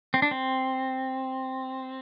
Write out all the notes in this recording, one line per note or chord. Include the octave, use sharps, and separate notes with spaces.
C4
D4
C4